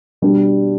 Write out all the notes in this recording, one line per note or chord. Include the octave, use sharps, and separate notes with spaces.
B2 G3 D4 G4